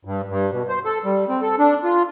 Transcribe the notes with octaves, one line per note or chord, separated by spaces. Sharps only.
G2
G2
B2
C5
A4
G3
C4
A4
D4
F4